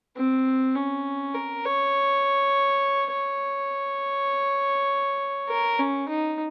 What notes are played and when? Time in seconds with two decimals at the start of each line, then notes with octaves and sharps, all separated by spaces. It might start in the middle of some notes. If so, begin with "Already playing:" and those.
0.17 C4
0.76 C#4
1.35 A#4
1.64 C#5
3.12 C#5
5.49 A#4
5.79 C#4
6.09 D#4